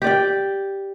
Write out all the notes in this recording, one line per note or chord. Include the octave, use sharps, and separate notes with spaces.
G4 D5 G5